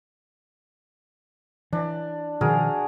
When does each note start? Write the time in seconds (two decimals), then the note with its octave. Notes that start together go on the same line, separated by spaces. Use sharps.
1.73 E3 D4
2.41 B2 D#3 F3 F#4 G#4 A#4